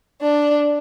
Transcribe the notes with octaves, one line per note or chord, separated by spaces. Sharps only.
D4